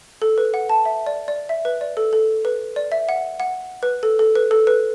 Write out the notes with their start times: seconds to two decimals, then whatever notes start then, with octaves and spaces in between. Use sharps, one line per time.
0.22 A4
0.38 B4
0.54 F#5
0.69 A5
0.85 E5
1.07 D5
1.28 D5
1.49 E5
1.65 B4
1.81 D5
1.97 A4
2.13 A4
2.45 B4
2.76 D5
2.92 E5
3.09 F#5
3.40 F#5
3.83 B4
4.03 A4
4.19 A4
4.35 B4
4.51 A4
4.67 B4